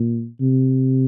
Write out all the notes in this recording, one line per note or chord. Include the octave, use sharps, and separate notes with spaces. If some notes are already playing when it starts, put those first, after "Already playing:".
Already playing: A#2
C3